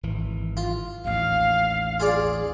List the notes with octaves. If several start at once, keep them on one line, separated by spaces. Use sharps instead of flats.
G#1 E3
F4
A1 D#2 F5
F4 G#4 D5